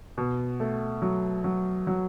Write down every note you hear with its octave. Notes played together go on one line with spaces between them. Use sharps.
B2
A3
F#3
F#3
F#3